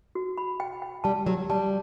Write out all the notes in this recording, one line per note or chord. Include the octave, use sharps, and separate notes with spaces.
F#4
B5
G5
G5
G3 A5
F#3 G4
G3 A5